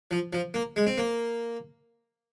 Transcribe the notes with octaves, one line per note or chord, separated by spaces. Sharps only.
F3
F3
A#3
G#3
C4
A#3